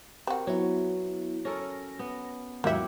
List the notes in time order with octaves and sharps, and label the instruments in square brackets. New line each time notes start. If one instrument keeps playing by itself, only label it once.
[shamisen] C4 F#4 [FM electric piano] G4 A#4
[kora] F#3 [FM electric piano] B3 E4
[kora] C#4 A4 A#4 [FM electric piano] A#6
[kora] B3
[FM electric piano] D#2 G#2 F#3 [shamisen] A#3 E5 [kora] E4 G4 F#5